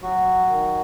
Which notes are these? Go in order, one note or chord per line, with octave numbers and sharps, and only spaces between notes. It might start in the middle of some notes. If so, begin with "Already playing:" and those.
F#3 F#4
D#3